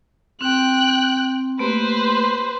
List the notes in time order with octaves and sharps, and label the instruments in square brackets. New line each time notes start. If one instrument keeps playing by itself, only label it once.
[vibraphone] C4 [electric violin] G5 F#6
[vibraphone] A3 A#3 G4 [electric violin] B4 C5